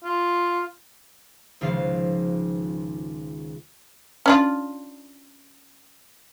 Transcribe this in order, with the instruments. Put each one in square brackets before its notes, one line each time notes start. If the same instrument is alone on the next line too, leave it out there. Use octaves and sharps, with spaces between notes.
[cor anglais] F4
[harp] G#1 C#2 C#3 F3 F5 C7
[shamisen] C#4 D4 F4